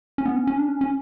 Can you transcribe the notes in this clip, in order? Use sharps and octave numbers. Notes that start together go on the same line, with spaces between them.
C#4
B3
C#4
C#4
D4
C#4
C#4